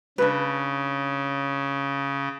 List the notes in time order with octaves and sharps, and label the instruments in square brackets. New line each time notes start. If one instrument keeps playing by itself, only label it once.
[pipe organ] C#3 [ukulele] D4 B4